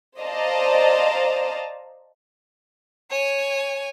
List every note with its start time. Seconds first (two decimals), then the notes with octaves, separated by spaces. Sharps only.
0.20 C5 D5 D#5 F5 A5 A#5
3.11 C#5 G#5